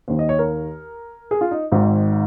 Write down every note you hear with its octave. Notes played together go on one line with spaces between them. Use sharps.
D#2 D#3 C5
D#5
C#5
A#4
G#4
F4
D#4
G#1 G#2 D#3